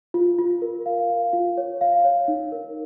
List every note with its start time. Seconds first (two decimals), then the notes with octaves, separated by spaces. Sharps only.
0.14 F4
0.38 F4
0.62 A#4
0.86 F5
1.10 F5
1.33 F4
1.57 C#5
1.81 F5
2.05 C#5
2.28 D#4
2.52 A#4